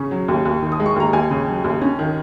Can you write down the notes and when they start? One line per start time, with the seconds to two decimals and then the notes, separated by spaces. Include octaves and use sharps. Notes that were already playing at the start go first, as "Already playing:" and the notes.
Already playing: C#3 C#4 C#6
0.11 F#3
0.28 D#2
0.45 D#2
0.62 D#3
0.72 D#6
0.80 G#3
0.86 C#6
0.96 D#2 A#5
1.13 D#2 G#5
1.31 C#3
1.47 F#3
1.64 D#2
1.82 C#4
1.99 D#3